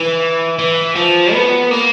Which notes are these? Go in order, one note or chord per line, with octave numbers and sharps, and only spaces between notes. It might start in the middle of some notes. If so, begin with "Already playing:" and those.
Already playing: E3
E3
F3
B3
A#3